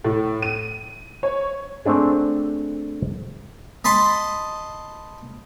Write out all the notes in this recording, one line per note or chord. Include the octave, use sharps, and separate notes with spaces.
A2
D#7
C#5
A3 C4 D4 G#4
D#5 A5 B5 C6